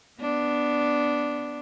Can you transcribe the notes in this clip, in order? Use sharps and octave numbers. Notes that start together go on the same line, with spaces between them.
B3 D4